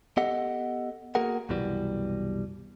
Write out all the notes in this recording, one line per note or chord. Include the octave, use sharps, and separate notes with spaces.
B3 G4 A4 D#5 F#5
A#3 F#4 G#4 A#4 F#5
C2 F#2 B2 E3 G3